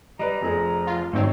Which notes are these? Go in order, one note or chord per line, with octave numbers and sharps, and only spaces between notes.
G3 B4 D#5 A#5
F1 F3 G#4
F4
G#2 D#3 F#3 A3 C4 D#4 C#5